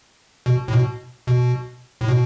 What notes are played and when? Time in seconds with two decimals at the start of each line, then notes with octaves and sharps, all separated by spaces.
0.46 B2
0.68 A2
0.73 B2
1.27 B2
2.01 A2
2.08 B2